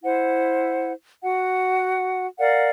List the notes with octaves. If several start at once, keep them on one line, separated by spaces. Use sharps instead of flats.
E4 C5 F#5
F#4 F#5
A#4 D5 F5 F#5